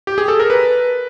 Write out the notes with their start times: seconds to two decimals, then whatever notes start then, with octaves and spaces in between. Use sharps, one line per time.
0.07 G4
0.18 G#4
0.28 A4
0.40 A#4
0.50 B4